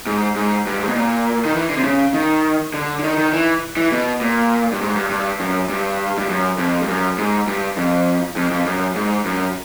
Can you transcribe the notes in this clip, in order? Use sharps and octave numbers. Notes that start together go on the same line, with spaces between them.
G#2
G#2
G2
G#2
B2
A#2
D#3
E3
D3
C3
C#3
D#3
D3
D3
D#3
D#3
E3
E3
B2
A#2
G2
G#2
G2
G2
F#2
G2
G2
F#2
F2
G2
F#2
G#2
G2
F2
F2
F2
F#2
G#2
F#2